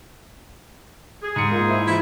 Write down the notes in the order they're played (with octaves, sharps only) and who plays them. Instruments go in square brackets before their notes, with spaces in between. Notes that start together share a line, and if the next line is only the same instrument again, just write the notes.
[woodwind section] G#4
[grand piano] G#2 C#7
[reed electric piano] A#3 F4
E4 C5
[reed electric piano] E3 F4 G#6 [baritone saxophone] E4